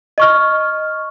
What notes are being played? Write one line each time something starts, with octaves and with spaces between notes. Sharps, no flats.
D#5 C#6 F6